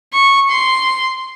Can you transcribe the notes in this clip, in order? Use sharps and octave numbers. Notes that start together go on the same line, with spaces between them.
C#6
C6